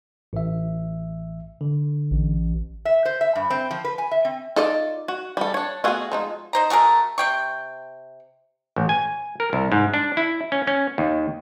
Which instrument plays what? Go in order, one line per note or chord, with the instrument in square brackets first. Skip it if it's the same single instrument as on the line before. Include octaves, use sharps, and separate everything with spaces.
[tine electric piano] A1 E5
D3
[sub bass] A1
[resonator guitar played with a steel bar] E5
C5
E5
G2
C4
F3
B4
G#5
E5
C4
[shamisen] D#4 A4 D#5 [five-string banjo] F4 D5
[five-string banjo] F#4
G3 A4
D4 C#5
[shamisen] A3 B3 [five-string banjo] F4 F#4 G#4
[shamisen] F3 G#3 D#4
[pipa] D#4 C5 A#5
A3 F#4 G#4 A#4
C3 G5 C#6
[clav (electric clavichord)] A1
G#5
A#4
C2
G#2
D4
E4
C#4
C#4
D#2